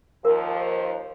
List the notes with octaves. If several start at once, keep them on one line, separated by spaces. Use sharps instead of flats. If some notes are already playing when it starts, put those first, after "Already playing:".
D#2 F3 A#4